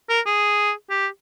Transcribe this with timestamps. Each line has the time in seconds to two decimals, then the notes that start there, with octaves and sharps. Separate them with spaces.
0.09 A#4
0.26 G#4
0.90 G4